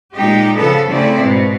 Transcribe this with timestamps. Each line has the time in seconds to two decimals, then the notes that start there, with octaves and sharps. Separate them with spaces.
0.15 A#2 G#3 D#4 G4
0.56 C#3 F3 B3 A4
0.88 C#3 A3 C4 E4 D5
1.20 G#2 B2